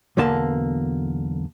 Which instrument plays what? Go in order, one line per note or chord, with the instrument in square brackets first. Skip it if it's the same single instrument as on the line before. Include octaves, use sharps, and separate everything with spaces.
[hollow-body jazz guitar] B1 E2 D3 A#3 A5